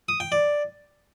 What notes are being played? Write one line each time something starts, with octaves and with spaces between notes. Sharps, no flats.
D#6
G5
D5